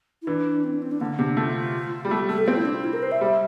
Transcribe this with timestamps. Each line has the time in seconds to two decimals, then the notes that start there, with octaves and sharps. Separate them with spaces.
0.22 E4
0.27 E3 D4
0.64 C4
0.73 D4
0.82 C4
0.91 D4
1.00 D3 A#3
1.19 C3 D4
1.37 A3 F4
2.05 G3
2.10 A3 G4
2.29 A3 G4
2.38 A4
2.47 C4 F4
2.57 E4
2.65 D4
2.74 F4
2.84 E4
2.93 A#4
3.02 C5
3.12 E5
3.21 G3